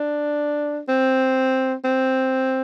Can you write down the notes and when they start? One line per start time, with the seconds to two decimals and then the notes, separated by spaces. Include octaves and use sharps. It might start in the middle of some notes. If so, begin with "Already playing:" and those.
Already playing: D4
0.89 C4
1.84 C4